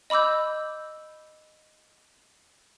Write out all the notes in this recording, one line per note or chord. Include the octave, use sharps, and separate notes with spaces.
D#5 B5 D6 E6 G6